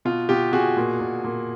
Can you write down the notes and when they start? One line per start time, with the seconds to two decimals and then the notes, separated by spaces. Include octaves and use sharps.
0.05 B2 F4
0.29 B2 F4 G4
0.53 B2 F#4 G#4
0.77 A#2
1.00 A#2
1.24 A#2